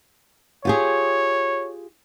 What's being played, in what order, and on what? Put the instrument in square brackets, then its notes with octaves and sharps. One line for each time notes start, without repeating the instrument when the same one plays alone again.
[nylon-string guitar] F4 G4 G#4 [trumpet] C#5